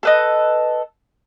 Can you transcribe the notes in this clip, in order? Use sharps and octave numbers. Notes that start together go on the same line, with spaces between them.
A4 B4 D#5